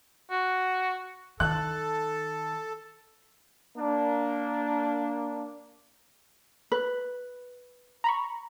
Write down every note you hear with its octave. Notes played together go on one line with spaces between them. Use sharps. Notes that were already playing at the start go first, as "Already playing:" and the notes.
F#4
D#3 A4 F#6
A#3 D4
B4
A#5 B5 C#6